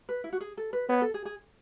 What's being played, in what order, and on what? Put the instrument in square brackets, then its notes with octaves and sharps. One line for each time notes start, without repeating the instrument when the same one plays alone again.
[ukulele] B4
E4
F#4
G#4
A4
B4
[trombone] B3 [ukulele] C#5
[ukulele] A4
G#4
G#4